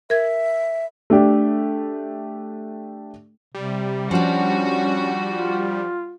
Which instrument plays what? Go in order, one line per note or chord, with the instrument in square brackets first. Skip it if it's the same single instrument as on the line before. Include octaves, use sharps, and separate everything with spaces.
[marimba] A#4 G#6 [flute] E5
[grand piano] A3 D4 G4
[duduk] C3 [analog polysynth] G3
[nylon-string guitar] F3 D4 [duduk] C#4 [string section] F#4
[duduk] F4